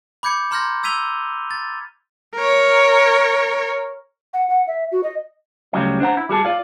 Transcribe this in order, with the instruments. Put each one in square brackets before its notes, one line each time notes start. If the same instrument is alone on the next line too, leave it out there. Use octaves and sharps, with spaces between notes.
[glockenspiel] B5 D6 G6 G#6 C#7
A#5 C6 F6 G6 G#6 A#6
E6 G#6 B6 D#7 F7 G7
A6
[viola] A#4 C#5
[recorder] F#5
F#5
E5
F#4
D#5
[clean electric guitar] D2 C#3 F#3 G3 D#5
D4 C5 F#5 A#5
E4
G3 F#4 G#4 A5
F4 D5 F5